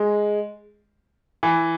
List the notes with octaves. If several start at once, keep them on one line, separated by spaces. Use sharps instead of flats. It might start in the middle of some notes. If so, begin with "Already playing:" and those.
Already playing: G#3
E3